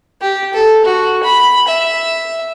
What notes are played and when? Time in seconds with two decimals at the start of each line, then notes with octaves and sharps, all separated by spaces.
0.22 G4
0.54 A4
0.84 F#4
1.23 B5
1.68 E5